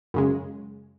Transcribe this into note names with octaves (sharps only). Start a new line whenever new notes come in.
F#2 C#3 G#3